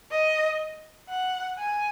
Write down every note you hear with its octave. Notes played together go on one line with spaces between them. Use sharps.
D#5
F#5
G#5